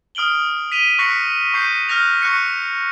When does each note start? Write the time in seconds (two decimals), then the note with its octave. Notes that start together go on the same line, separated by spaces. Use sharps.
0.15 D#6 F6 D7 F#7 G7
0.72 B6 D#7 F7 G7
0.99 C#6 F#6 A#6 B6 C#7 F#7
1.54 C#6 G6 C7 D#7
1.89 F6 F#6 A#6 F7
2.22 C#6 F#6 A#6 C#7